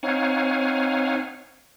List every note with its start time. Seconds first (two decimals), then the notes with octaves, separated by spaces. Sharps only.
0.03 C4 D#4 C#5 F5 F#5 G#5